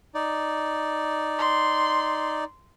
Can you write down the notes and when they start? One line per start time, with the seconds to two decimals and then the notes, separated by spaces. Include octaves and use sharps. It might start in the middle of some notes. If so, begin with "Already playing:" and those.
0.14 D#4 D5
1.38 C6